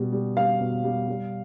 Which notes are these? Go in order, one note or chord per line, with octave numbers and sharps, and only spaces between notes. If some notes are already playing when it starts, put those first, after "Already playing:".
Already playing: B2 G3
G3
G3 F5
B2
G3
G3